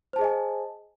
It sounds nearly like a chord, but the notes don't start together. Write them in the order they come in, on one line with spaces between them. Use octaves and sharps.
C5 A5 G#4 D#5 G#5